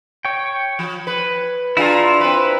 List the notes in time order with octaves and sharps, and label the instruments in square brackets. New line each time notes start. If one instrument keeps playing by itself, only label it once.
[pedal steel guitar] C#5 G5
[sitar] F3
B4
[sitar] D4 F4 G#4 [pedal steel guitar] E4 A#5
[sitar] C4 B4